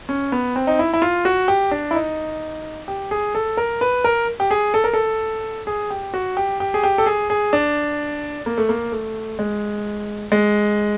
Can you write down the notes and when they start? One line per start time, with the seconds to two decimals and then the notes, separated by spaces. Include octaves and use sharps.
0.09 C#4
0.32 B3
0.56 C4
0.67 D#4
0.79 E4
0.93 E4
1.02 F4
1.25 F#4
1.48 G4
1.71 D4
1.91 E4
1.95 D#4
2.88 G4
3.11 G#4
3.35 A4
3.57 A#4
3.81 B4
4.04 A#4
4.40 G4
4.51 G#4
4.74 A4
4.84 A#4
4.94 A4
5.67 G#4
5.90 G4
6.14 F#4
6.37 G4
6.60 G4
6.74 G#4
6.83 G4
6.98 A4
7.06 G#4
7.30 G#4
7.53 D4
8.46 A#3
8.58 A3
8.69 A#3
8.92 A3
9.39 G#3
10.32 G#3